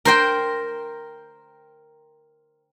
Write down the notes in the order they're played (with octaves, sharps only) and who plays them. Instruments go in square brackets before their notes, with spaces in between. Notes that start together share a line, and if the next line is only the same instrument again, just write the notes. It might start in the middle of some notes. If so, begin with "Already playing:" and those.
[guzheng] A#4 C5 G5